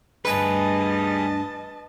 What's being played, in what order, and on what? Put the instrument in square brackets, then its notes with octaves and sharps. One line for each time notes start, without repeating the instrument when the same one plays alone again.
[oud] D2 G2 [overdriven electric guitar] G3 G#4 [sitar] B4 [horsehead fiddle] D#5 A5